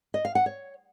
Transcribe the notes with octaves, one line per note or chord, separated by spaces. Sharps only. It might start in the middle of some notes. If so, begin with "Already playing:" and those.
D#5
F5
F#5
C#5